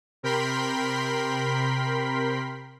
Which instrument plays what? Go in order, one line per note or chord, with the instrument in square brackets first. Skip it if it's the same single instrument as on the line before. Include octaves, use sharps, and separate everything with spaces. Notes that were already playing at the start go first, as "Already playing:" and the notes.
[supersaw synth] C3 A#4 G5 B5 C6 B6